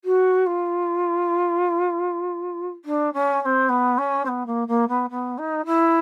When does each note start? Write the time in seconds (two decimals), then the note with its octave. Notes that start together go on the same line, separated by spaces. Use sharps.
0.04 F#4
0.46 F4
2.84 D4
3.13 C#4
3.42 C#4
3.45 C4
3.69 B3
3.98 C#4
4.25 C4
4.28 B3
4.46 A#3
4.67 A#3
4.88 B3
5.10 B3
5.38 D#4
5.65 E4